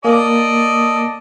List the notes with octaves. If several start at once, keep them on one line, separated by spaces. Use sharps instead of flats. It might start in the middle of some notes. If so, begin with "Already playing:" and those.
A#3 A4 D5 D#5